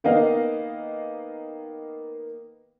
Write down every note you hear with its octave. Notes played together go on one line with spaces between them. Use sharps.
D#3 A#3 B3 D#4 D#5 F5